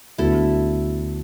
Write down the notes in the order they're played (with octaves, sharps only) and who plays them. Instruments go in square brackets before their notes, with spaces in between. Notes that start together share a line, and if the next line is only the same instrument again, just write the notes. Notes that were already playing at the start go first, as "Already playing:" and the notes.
[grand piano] D2 D3 B3 F#4 [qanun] E4 A4